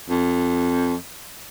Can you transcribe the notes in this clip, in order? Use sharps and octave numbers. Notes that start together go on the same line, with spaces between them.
F2